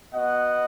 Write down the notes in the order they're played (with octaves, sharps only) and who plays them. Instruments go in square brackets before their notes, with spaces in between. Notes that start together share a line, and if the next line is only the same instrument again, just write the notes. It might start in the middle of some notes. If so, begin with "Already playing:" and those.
[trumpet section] B3 F#4 D#5 F#5